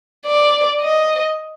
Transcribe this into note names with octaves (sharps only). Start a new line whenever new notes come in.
D5
D#5